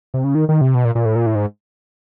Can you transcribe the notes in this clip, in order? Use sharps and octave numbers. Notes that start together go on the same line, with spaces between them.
C3
C#3
D#3
D#3
C3
B2
A#2
A#2
A2
A#2
A2
G#2